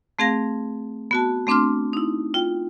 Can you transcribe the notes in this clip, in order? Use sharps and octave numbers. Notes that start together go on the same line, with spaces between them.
A3 C4 G#4 F5 A#6
B3 F#4 A5
A3 C4 D4 C6 D6 F6
D#4 E4
F4 G5